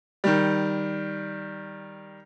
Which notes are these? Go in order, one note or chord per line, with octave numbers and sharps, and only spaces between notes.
D#3 G3